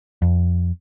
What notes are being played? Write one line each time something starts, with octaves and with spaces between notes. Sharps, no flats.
F2